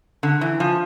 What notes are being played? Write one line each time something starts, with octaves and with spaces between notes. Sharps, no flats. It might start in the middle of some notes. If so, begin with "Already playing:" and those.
D3
E3
F3